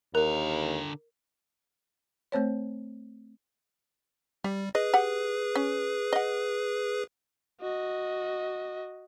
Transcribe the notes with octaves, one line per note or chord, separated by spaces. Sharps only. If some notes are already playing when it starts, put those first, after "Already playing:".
D#2 D3 A#4 A#5
A3 C4 C5 C#5
G3 G4
G#4 B4 D#5
G4 F#5
C#4
D#5 F#5
F#4 D#5